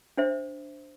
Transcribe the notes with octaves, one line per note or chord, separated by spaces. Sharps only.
D4 C5 E5